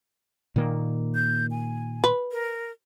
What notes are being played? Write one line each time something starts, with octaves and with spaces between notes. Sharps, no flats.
A#2 D#3 A#3
G6
G#5
B4
A#4